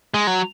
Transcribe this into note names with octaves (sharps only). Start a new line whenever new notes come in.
G#3
F#3